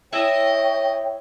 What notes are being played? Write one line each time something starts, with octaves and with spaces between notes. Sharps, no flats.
E4 C#5 D#5 E5 G5